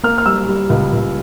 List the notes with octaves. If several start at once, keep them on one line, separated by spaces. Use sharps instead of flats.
A#3 F6
F6
G3 E6
G3
C#2
C#2